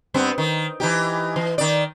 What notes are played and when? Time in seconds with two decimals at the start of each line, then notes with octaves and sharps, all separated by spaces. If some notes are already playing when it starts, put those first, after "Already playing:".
0.14 G2 B3 C4
0.38 D#3
0.80 E3 D#4 G4
1.36 E3
1.58 D#3 D5